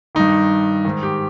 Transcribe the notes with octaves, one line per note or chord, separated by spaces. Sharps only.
G2 D#3 D#4
G#2 D#3
G4